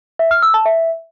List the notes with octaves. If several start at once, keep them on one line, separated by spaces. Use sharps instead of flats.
E5
F6
E6
A5
E5